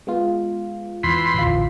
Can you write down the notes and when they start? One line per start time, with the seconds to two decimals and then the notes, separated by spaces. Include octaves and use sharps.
0.07 G#3 B3 F4
1.03 E2 B5 C6
1.34 A1 D2 F4